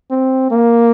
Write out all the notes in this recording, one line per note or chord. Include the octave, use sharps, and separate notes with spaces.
C4
A#3